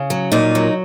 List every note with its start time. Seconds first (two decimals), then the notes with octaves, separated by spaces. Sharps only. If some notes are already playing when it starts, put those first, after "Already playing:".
Already playing: C#3
0.10 F#3
0.32 A#2 D#4
0.55 F#3